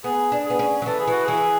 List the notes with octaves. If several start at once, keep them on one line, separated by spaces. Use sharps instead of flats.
B3 G#4
D4
B3 G#4
C#4
F#3
E3 A4
G#4
E3 F#4
E3 G#4